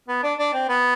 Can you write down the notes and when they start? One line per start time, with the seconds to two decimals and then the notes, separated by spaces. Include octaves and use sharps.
0.08 B3
0.23 D4
0.39 D4
0.54 C4
0.69 B3